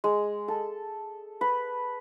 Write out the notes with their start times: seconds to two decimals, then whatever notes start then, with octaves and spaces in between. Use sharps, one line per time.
0.04 G#3
0.48 A4
1.41 B4